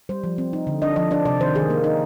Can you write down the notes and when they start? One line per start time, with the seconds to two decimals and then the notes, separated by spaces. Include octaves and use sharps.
0.09 G3 C5
0.24 F3
0.38 C4
0.53 D#4
0.67 D3
0.82 D4 D#5
0.96 F3 D#5
1.11 D4 D5
1.25 C3 D5
1.40 D#3 C5
1.55 D#3 G#4
1.70 A#3
1.84 D#4